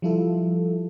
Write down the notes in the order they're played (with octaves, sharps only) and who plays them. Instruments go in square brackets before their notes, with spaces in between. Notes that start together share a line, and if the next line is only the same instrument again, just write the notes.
[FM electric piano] F3 G3 E4 F4 A4